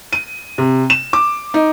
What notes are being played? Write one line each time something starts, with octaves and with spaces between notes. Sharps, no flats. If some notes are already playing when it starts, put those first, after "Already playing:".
D#7
C3
E7
D6
D#4